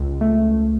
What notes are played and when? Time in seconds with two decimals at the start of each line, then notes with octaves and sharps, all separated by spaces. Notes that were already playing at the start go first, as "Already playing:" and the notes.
Already playing: C#2
0.21 A3